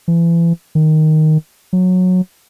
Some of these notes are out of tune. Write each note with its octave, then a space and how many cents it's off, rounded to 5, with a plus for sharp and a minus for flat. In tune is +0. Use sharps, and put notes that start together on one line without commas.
E3 +35
D#3 +0
F#3 -15